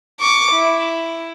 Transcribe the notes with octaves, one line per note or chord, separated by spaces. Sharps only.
C#6 D6
E4